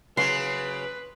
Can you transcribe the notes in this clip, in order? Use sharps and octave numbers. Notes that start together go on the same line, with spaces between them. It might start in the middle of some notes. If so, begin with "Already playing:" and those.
C#3 F#3 B4 C6